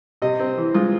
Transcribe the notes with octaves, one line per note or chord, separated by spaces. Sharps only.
C3 D#5
C4
E3
G#3 F4